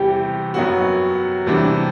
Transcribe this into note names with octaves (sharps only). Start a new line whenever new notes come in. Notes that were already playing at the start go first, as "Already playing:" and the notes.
Already playing: E2 C3 E3 G3 G4
F#2 F#3 B3 F#4
E2 C3 E3 G3 D4